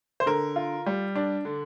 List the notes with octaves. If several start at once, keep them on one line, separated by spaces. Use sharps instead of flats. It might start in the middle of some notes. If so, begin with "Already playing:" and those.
C5
D3 A#4
F4
G3
D4
D3